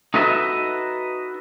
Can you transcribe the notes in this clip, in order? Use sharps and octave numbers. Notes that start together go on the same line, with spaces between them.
D#4 F#4 A4 B4 D#5 E5